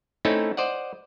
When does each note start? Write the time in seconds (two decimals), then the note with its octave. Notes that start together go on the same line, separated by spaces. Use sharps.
0.25 A3 C4 C#4 D#4 E4 A4
0.57 C5 D5 D#5 F#5